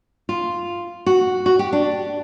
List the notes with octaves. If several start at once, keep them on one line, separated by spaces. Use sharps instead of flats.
F4
F#4
F#4
G4
D4